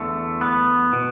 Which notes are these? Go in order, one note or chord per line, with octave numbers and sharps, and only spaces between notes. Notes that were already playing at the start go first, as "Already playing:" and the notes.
Already playing: E2 D3 A3
B3
B2